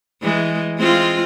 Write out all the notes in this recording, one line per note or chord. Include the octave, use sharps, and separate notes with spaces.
E3 G#3
G#3 C4 F4